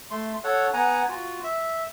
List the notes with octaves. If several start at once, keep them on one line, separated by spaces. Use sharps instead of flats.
A3 C6
A4 C#5 F#5
B3 F#5 G#5 A#5
F4 F#4
E5